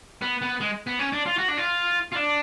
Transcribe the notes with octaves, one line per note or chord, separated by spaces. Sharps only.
B3
B3
G#3
B3
C#4
D4
F4
F#4
D4
F4
F4
D4